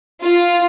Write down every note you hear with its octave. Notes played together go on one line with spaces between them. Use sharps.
F4